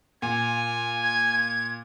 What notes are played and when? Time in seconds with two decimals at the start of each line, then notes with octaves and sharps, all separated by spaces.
0.22 A#2 G#5
1.02 G#6